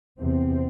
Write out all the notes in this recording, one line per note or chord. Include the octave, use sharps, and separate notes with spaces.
E2 C3 C4